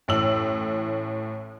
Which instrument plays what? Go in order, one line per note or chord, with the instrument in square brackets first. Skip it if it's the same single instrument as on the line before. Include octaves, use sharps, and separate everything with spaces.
[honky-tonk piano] A1 A2 E6 F#7